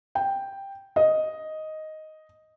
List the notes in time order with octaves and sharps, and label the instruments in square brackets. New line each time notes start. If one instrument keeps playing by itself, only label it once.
[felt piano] G5
D#5